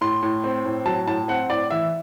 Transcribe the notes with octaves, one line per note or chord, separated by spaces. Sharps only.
A2 C6
A2
C4
A2
F#3 A5
A2 A5
C4 F#5
A2 D5
E3 E5